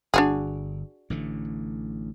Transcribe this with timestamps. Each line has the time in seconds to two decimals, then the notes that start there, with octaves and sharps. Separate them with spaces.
0.14 G1 D4 F#4 G#4
1.10 A1 D3 A3